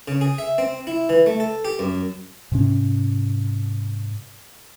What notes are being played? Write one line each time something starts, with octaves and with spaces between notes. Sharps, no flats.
C#3
G#4
E5
C4
E4
E3
A3
A4
G4
F#2
G#2 C3 C#4